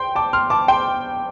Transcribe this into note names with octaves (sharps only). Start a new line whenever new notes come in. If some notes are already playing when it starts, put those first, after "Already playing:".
Already playing: G5 C6
A5 D6
C6 F6
A5 D6
G5 C6